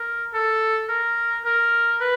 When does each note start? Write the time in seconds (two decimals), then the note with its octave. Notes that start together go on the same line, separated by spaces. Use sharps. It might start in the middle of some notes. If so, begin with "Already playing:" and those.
Already playing: A#4
0.34 A4
0.89 A#4
1.45 A#4
2.01 B4